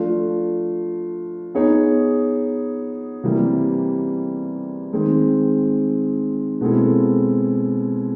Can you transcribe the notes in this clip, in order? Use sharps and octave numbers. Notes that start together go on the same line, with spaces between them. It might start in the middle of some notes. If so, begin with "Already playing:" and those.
Already playing: F3 A3 D4 F4
B3 D#4 G#4 C#5
C3 E3 G3 A#3
D#3 G#3 C4
B2 G#3 C4 E4 A4